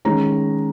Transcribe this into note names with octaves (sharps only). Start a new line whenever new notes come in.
D#3 G#3 C#4 A#5